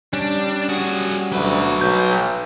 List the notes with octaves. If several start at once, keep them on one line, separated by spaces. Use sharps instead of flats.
G3 C#4 D4
F#4 G#4
D2 F#3 B4
B1 G6